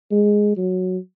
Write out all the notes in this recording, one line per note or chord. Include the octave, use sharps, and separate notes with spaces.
G#3
F#3